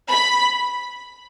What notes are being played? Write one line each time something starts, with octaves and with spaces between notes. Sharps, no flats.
B5